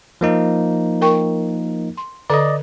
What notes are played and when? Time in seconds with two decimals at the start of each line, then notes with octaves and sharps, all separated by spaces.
0.21 F3 A#3 D#4
1.02 A#4 G5 C#6
1.97 C6
2.30 D3 A4 D5 D#5 A#5